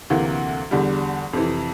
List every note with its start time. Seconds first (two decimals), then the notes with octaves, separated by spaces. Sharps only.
0.10 D2 C3 E3 A#3
0.71 E2 D3 G3
1.33 F2 C3 E3